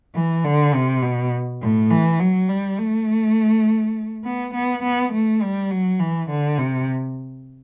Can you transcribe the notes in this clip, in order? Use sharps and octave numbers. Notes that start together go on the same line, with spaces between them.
E3
D3
C3
B2
A2
E3
F#3
G3
A3
B3
B3
B3
A3
G3
F#3
E3
D3
C3